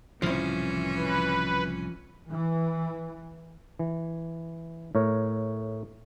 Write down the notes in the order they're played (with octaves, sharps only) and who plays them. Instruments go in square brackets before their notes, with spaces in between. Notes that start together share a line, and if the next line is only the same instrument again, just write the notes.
[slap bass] C2 A2 C#3 [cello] E3 C#4 [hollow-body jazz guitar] F3 E4
[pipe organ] B4
[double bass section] E3
[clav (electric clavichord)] E3
A2 A#4 C#5